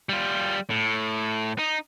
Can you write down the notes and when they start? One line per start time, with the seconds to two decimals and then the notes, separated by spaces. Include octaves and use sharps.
0.09 G3 F4
0.70 A2
1.59 D#4